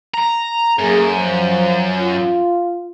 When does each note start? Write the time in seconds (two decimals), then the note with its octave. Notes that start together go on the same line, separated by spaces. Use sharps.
0.14 A#5
0.79 F#2 A3 A#3 G#4
1.14 F3
1.99 F4